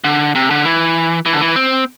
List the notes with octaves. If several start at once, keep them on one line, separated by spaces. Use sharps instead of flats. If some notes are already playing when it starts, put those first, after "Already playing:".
D3
C3
D3
E3
E3
D3
E3
C4